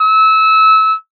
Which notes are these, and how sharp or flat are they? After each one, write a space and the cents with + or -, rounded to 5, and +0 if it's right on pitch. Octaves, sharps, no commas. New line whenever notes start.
E6 -25